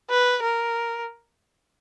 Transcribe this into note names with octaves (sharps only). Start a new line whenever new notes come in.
B4
A#4